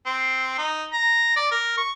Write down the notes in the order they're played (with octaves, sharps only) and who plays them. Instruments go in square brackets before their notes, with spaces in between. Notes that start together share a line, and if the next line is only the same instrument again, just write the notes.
[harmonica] C4
D#4
A#5
D5
A#4
C#6